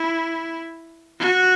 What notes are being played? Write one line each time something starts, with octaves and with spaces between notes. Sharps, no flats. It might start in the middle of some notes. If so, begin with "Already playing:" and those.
Already playing: E4
F#4